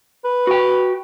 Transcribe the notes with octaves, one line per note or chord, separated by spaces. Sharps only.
B4
F#4 G5